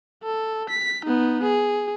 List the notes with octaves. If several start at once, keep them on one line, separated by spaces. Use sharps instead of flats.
A4
B6
B3 D#4
G#4